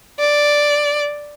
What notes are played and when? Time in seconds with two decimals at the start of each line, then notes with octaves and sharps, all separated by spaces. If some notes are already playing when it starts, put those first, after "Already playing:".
0.19 D5